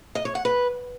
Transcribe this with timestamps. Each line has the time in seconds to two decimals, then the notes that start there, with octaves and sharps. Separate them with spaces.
0.15 D#5
0.25 C#5
0.35 F#5
0.45 B4